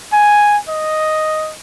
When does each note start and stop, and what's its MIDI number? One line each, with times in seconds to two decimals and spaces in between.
0.13 0.58 80
0.69 1.53 75